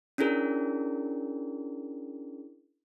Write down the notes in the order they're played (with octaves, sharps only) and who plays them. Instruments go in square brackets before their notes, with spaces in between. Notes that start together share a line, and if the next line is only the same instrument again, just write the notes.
[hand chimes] C#4 D4 E4 G#4 A#4